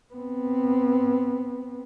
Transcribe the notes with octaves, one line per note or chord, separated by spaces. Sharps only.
B3 C4